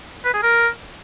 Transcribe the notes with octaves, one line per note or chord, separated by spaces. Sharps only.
B4
G#4
A#4